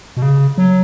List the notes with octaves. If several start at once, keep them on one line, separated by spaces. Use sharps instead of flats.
B2
C#3
F#3